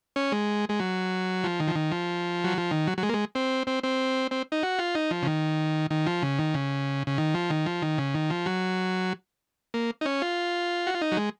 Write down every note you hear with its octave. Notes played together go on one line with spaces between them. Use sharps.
C#4
G#3
G#3
F#3
F3
D#3
F3
D#3
F3
F#3
F3
D#3
F#3
F#3
G#3
A#3
G#3
C4
C4
C4
C4
D#4
F#4
F4
D#4
F3
C#3
D#3
D#3
F3
C#3
D#3
C#3
C#3
D#3
F3
D#3
F3
D#3
C#3
D#3
F3
F#3
A#3
D#4
C#4
F4
F#4
F4
D#4
F#3
G#3